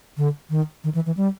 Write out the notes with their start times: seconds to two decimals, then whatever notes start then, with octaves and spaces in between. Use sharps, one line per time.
0.18 D3
0.50 D#3
0.84 D#3
0.95 E3
1.06 E3
1.17 G3